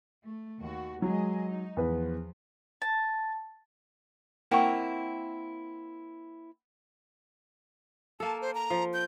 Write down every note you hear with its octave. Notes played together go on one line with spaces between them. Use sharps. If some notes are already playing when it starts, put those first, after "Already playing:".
A3
D#2 F#4
F#3 G#3 G#4 D#5
D#4
E2 F3 B4
A5
A#3 C4 E4 F#5 G5 C#6
A#3 A4 A5
C5
A#5
F3
G6